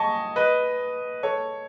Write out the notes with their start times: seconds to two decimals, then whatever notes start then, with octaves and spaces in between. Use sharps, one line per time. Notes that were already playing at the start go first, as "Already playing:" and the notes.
Already playing: D#5 G#5 A5 C#6
0.36 B4 D#5
1.23 A4 C#5